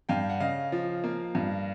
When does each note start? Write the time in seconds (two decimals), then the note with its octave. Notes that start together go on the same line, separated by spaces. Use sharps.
0.09 G2 F5 G5
0.30 F#5
0.40 C#3 D#5 F5
0.72 F3
1.04 A#3
1.35 G2